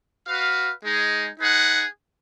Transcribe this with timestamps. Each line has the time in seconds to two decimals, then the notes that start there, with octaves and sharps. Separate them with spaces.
0.27 F#4 B4 F5
0.84 G#3 D#4 G#4
1.40 D#4 G#4 B4 F#5